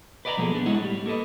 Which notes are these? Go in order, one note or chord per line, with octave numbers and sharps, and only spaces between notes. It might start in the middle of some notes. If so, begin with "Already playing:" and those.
B4 D5 D#5 F5 A#5 B5
B2 F3 F#3 A#3 G#4 A4
F#3 B3 D4
G#3 E4 C#5 D#5 F#5
A2 G3
A#3 A4 B4 D#5